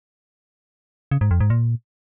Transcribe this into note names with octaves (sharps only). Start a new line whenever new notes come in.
C#3
G#2
F2
G#2
A#2